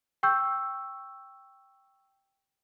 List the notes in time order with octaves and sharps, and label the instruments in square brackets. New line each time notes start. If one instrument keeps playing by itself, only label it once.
[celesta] G5 C#6 E6 G6